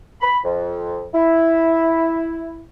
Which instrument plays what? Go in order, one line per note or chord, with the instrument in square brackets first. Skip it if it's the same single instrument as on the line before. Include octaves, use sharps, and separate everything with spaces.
[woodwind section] B5
F2
E4